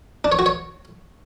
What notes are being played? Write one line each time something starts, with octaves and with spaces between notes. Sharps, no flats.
D4
C#5
F#4
C#5